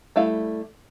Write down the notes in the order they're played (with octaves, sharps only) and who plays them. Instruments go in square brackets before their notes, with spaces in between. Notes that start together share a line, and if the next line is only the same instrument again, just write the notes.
[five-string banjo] G3 A3 E4 F5